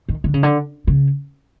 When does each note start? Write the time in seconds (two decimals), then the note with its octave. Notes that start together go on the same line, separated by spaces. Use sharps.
0.09 D#3
0.24 D3
0.34 C#3
0.43 D3
0.87 C#3